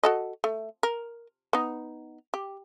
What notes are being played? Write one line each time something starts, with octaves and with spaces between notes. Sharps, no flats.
F#4 A4 D#5
A3
A#4
B3 D#4
G4